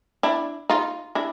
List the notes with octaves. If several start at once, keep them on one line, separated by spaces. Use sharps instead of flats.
D4 E4
D#4 F4
D4 E4